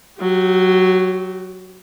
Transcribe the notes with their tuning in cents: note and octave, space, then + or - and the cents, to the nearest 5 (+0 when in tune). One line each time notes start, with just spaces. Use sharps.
F#3 +0 G4 -30